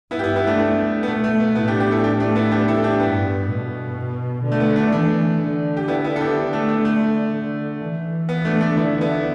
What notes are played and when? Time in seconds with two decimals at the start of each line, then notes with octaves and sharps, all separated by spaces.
0.11 G2 B3 E4
0.19 G4
0.24 B3 E4
0.36 B3 E4
0.47 A3 D4
0.59 A3
1.03 B3
1.08 B2 A3
1.24 A3
1.40 B3
1.55 A2 B3 E4
1.68 D4 G4
1.80 D4 G4
1.91 E4 A4
2.04 D4 G4
2.20 A3 D4
2.36 B3 E4
2.52 D4 G4
2.68 E4 A4
2.84 D4 G4
3.00 G2 B3
3.48 B2
4.45 D3
4.52 A3
4.60 B3
4.76 A3 D4
4.92 E3 A3 D4
5.40 D3
5.77 G4
5.88 B3 E4
6.04 B3 E4
6.16 A4
6.20 D4 G4
6.36 D3
6.53 A3 D4
6.69 A3
6.85 A3
7.33 D3
7.81 E3
8.29 B3
8.45 A3 D4
8.61 A3 D4
8.77 D3 B3 E4
9.01 B3 E4